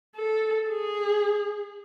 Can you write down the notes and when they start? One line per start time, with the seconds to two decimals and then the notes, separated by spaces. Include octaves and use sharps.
0.16 A4
0.69 G#4